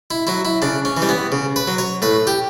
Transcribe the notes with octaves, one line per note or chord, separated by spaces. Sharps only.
E4
F#3 E4
E4
C#3 D4
C#4
E3
G3
B3
C#3
B4
F#3
C#5
A2 B4
G4